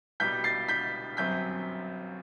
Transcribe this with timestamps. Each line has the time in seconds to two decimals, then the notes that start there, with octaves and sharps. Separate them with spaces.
0.20 C2 B2 G3 G6 B6
0.44 A6 C7
0.69 G6 B6
1.17 G1 F#2 F#3 C4 G6 B6